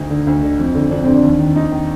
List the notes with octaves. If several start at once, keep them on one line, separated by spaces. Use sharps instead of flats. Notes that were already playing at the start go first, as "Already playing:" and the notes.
Already playing: D2 D#4
D3
D2
D3
F2
D3
F2 D4
D3 C4
D4
D#2
D#3
D#2 D#4
D#3